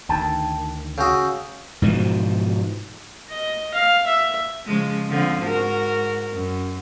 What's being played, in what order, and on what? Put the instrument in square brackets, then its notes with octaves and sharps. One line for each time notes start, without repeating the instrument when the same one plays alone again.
[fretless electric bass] D2 D#3 [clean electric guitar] G5 A5
[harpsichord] C#3 F#4 [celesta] D#6 E6 G6
[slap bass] G#2 B2 E3 F3
[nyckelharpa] D#5
F5
E5
[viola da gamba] C#3 F3 G#3
D3 F3 C4
G#2 F#4 A#4
F#2